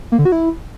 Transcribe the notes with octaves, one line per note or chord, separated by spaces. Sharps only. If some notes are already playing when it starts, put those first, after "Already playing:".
A#3
D3
F#4
E4